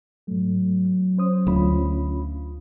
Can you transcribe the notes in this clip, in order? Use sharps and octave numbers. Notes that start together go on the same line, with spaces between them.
G#2 F#3 A3
C#4 C5 D#6
D2 C#4 F4 B5